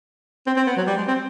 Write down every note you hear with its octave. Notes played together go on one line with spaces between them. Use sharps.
C4
C4
B3
F#3
G3
G#3
C4